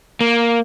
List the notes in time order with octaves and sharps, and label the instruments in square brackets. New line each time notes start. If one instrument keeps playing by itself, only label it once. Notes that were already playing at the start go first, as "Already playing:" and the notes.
[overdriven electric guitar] A#3